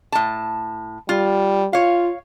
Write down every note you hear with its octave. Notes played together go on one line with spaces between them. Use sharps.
A2 A5
G3 F4
F4 C#5 F5